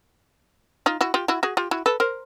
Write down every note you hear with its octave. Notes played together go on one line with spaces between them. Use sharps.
D#4 F4
E4 F#4
F4 G4
E4 F#4
F#4 G#4
F4 G4
E4 F#4
A4 B4
A#4 C5